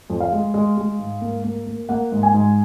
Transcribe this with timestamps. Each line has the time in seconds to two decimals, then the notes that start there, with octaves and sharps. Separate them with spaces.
0.10 F2
0.20 F5
0.32 G#3
0.54 G#3
0.77 G#3
0.99 G#2
1.21 A#3
1.44 A#3
1.66 A#3
1.89 A#3 F#5
2.12 G#2
2.23 G#5
2.34 G#2